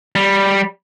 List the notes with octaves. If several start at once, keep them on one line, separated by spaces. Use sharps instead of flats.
G3